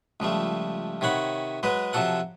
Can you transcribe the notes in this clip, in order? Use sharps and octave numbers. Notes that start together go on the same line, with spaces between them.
C#2 F3 G3 A3
C3 D#3 C#5 F#5 B5
F#3 G#3 B4 D#5
C3 F3 F#3 A4 F#5